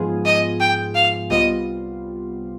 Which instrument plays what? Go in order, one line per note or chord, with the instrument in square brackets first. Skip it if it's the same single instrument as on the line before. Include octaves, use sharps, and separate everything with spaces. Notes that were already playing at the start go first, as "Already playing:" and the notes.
Already playing: [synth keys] G#2 F3 B3 F4 G#4
[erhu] D#5
G5
F5
[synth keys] C2 C3 G3 B3 F4 [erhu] D#5